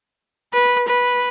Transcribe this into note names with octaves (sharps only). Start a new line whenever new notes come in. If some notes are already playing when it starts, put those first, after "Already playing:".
B4
B4